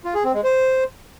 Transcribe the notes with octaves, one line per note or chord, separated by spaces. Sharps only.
F4
G#4
C4
G#3
C5